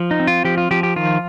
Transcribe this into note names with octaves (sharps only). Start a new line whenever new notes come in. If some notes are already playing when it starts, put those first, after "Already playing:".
Already playing: F3
D#4
C4
F4
F3 G4
F4
F3 G4
G4
D#3 F4